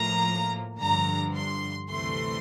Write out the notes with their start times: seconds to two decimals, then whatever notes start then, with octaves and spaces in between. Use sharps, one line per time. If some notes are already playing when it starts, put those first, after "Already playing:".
Already playing: A2 F3 A#3 A#5
0.79 G2 D3 F3 A#5
1.34 C6
1.89 D2 C3 E3 A3 C6